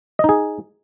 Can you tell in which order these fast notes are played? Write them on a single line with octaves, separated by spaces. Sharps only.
D#5 D#4 G#4